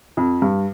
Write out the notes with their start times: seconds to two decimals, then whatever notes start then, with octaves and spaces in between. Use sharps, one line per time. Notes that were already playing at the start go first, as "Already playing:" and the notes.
0.17 F2
0.42 G2